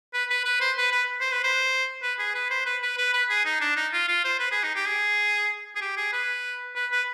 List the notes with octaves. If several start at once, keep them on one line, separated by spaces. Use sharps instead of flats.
B4
B4
B4
C5
B4
B4
C5
B4
C5
B4
G#4
B4
C5
B4
B4
B4
B4
G#4
D#4
D4
D#4
F4
F4
C5
B4
G#4
D#4
G4
G#4
G#4
G4
G#4
B4
B4
B4